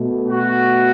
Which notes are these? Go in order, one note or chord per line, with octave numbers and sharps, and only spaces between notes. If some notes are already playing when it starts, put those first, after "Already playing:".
Already playing: B2 A3
F#4